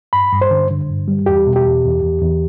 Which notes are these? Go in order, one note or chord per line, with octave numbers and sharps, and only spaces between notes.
G2 B5
G2
C5
D3
D3
G2
G3
E2 G4
B2
G4
E2
E2
E2
E2